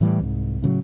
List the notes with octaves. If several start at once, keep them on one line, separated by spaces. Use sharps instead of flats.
A2 E3 G3
C2 G#2
A2 C#3 F3 F#3